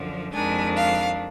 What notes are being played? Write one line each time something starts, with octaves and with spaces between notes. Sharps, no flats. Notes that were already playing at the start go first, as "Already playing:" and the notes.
Already playing: F#2 D3 F3
F2 D#3 G#3 D4 G#5
F5